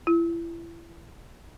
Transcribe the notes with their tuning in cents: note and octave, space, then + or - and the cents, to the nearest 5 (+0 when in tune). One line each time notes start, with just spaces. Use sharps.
E4 +30